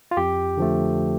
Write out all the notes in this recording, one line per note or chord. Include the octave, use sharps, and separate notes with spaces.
F4
F2 G4
D3 F3 A3